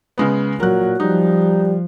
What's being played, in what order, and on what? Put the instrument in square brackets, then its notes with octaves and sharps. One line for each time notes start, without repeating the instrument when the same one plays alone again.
[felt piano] C#3 G#3 B3
[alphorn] A#2 [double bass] F#3 [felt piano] A#4 F#6
[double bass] F3 [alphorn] G3 [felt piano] D#4